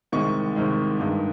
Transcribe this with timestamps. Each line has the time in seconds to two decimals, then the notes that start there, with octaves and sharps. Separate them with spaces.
0.12 C2 C3 D#3 G#3 C#6
0.56 C2 C3 D#3 G#3
1.00 G2 D#3 G#3